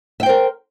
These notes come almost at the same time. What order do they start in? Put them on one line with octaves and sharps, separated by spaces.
E5 G5 C5 A#4